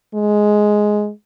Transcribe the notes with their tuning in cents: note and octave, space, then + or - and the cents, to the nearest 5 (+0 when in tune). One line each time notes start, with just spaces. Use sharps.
G#3 +5